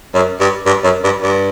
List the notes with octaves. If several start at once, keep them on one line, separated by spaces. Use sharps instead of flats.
F#2
G2
G2
F#2
G2
G2